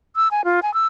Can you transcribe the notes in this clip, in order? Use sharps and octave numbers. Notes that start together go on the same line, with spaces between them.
E6
G#5
F4
G#5
E6